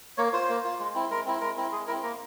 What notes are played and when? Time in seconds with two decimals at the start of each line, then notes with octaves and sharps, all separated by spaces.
0.18 A#3 C#5
0.33 F4 C5
0.49 A#3
0.64 F4
0.79 G#3
0.95 C4 E4
1.10 G#3 A#4
1.26 C4 E4
1.41 G#3 A#4
1.57 C4 E4
1.72 G#3 G#4
1.87 C4 E4 A#4
2.03 A#3 A#4